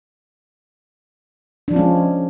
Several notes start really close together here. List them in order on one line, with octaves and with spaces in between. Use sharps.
D4 F3 F4 C#4 G#3